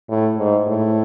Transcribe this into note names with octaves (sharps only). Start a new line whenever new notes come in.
A2
G#2
A2